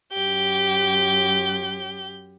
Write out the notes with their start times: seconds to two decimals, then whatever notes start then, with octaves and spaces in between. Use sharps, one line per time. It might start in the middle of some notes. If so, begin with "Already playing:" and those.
0.14 F#2 G4 G6